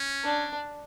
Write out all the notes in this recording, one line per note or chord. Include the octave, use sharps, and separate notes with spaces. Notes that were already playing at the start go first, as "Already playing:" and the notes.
Already playing: C#4
D4